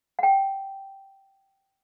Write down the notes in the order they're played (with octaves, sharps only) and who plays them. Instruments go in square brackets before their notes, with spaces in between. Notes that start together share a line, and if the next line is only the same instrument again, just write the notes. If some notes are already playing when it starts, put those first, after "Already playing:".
[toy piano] F#5 G5